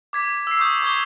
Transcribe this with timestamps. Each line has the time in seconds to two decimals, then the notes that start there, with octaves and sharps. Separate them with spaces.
0.13 D6 G#6 B6
0.47 E6 C7
0.60 C#6 D#6 G6
0.83 C#6 D6 G#6 C7 G7